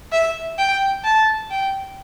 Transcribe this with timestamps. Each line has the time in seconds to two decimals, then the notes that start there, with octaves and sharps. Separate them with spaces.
0.12 E5
0.58 G5
1.04 A5
1.51 G5